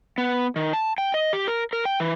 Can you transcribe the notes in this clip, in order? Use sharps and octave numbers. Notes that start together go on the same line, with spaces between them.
B3
D#3
A5
G5
D#5
G4
A#4
A#4
G5
E3